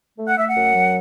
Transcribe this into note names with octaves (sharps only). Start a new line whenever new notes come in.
A3
F#5
A3 E5
F#5
F#2
F#3